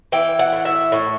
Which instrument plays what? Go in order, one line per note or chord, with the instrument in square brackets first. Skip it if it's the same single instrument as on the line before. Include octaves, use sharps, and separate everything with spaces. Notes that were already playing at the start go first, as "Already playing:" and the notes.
[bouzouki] E3 G5
F#5
A2
E5
A2